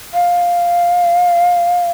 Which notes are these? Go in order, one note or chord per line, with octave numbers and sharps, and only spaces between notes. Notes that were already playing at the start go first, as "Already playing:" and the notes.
F5